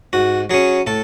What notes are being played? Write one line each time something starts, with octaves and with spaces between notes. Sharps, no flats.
G#2 F#4
F#3 C#4 G#4
A2 A4